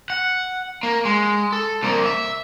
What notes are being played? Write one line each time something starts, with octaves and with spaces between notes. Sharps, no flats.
F#5
A#3
G#3
A4
C2 A#3
E5